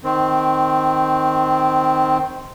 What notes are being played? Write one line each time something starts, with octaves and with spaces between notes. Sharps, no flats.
D#3 C4